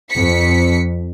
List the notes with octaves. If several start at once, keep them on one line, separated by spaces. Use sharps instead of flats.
F2 B6 C#7